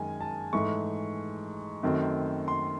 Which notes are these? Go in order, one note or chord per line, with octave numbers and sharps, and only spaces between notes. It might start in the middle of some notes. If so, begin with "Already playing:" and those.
Already playing: F#2 D#3 G#3 G#5
A5
G#2 E3 A3 C#6
F#2 D#3 A3 C4
C6